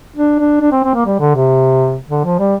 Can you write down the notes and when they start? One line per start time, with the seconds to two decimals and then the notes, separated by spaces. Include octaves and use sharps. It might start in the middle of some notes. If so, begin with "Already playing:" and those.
0.16 D4
0.39 D4
0.60 D4
0.72 C4
0.84 C4
0.94 A#3
1.06 G3
1.20 D3
1.35 C3
2.09 D3
2.25 F3
2.39 G3